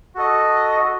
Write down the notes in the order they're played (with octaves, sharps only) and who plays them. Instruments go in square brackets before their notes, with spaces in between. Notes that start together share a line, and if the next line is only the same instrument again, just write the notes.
[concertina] F#4 A4 D#5